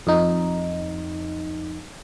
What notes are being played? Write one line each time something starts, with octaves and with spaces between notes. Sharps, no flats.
F2 D#4